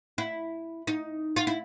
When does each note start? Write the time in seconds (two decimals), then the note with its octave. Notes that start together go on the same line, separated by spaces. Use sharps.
0.18 E4
0.87 D#4
1.36 F4
1.47 E4